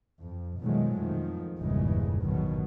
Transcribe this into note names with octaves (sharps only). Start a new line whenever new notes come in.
F2
B2 D#3 F3 F#3 G#3 A3
F2 D#3 F3
G1 E2 G2 A#2 C#3 G#3
G#1 G2 B2 D#3 F#3